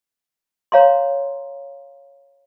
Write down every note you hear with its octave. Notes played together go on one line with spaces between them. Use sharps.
C#5 F5 A#5 C6